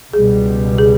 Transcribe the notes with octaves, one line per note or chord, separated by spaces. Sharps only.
C#2 B2 G3 G#4
G#4